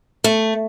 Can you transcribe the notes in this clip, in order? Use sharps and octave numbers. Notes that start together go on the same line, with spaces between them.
A3